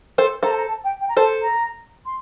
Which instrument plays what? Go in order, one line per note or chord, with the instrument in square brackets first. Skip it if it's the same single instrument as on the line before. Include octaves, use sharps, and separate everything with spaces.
[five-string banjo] A4 C5 [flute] C6
[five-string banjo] A4 C5 [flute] A#5
[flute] A5
A#5
A5
G5
G5
A#5
[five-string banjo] A4 C5 [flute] A5
[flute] A#5
C6